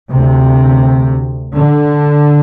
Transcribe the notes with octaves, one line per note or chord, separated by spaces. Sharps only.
D2 C3
D3